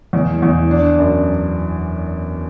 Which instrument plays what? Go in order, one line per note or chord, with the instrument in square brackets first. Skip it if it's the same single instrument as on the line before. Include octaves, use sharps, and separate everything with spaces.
[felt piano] E2
E2
D4
F#2